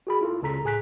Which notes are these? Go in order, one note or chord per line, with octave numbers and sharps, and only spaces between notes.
F#4 G#4 B5
E4 F4 A4
C#2 C#3 A4 A#5 B6
A2 G#4 G#5 F#6 B6